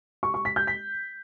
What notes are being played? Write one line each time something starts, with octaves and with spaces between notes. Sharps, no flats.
C#6
C#6
B6
G6
B6